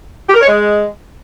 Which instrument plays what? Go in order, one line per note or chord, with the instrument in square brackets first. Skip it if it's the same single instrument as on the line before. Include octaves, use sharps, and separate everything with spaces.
[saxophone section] G4
A#4
C#5
G#3